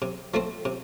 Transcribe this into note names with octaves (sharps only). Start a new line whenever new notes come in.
C3
F3 A3 C4
C3